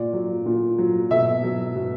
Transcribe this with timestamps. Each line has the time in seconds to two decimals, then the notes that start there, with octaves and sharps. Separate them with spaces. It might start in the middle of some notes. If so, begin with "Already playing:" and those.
Already playing: A#2 D5
0.13 F#3
0.46 A#2
0.78 F#3
1.11 B2 E5
1.44 F#3
1.76 B2